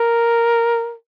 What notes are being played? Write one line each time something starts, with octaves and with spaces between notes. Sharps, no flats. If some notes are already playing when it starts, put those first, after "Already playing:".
Already playing: A#4